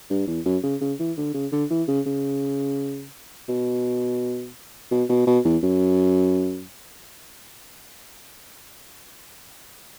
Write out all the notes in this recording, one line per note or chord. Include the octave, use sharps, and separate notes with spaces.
G2
E2
F#2
C#3
C#3
E3
D3
C#3
D3
E3
C#3
C#3
B2
B2
B2
B2
E2
F#2